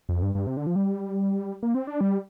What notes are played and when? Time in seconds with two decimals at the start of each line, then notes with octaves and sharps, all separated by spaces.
0.09 F2
0.22 G2
0.35 G2
0.47 C3
0.57 D3
0.67 F3
0.76 G3
1.63 A#3
1.75 C4
1.87 D4
2.01 G3